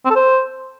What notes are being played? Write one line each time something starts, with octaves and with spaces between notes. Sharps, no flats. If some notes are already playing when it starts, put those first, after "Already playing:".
C4
A4
C5